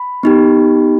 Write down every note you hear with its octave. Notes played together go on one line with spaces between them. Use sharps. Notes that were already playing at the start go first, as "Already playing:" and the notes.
Already playing: B5
B3 D#4 G4